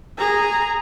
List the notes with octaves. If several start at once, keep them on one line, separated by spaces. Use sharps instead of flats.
G#4 A#5